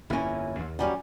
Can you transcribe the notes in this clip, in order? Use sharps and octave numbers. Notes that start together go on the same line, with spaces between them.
G1 F2 A#3 C#4 E4
D#2
F#2 G3 C#4